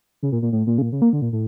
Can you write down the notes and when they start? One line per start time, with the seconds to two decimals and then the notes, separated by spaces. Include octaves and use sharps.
0.23 C#3
0.32 A#2
0.42 A#2
0.52 A2
0.67 A#2
0.78 C#3
0.82 A#2
0.92 C#3
1.02 A#3
1.13 D3
1.22 A#2
1.33 A2